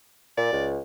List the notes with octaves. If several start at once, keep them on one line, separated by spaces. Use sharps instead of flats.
A#2 D5
C#2